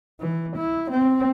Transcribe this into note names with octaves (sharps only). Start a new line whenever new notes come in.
E3
E4
C4